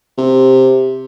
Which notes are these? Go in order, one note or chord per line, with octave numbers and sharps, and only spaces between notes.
C3